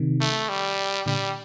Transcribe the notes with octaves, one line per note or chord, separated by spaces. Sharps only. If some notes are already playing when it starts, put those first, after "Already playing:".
Already playing: C3 D#3
A3
G3
A#2 D3 G3